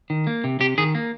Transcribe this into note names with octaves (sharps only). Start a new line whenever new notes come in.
D#3
A#3
C3
C3 G4
D#3 G#4
A#3